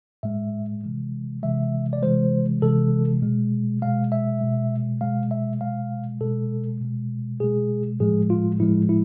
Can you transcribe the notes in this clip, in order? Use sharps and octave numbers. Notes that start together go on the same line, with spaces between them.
A2 G#3 E5
C3 E3 G#3
C3 E3 G#3 E5
D5
C3 E3 G#3 C5
C3 E3 G#3 A4
B2 G#3
B2 G#3 F5
E5
B2 G#3
B2 G#3 F5
E5
B2 G#3 F5
B2 G#3 A4
B2 G#3
B2 G#3 G#4
A2 F3 G#3 G#4
F4
A2 F3 G#3 E4
E4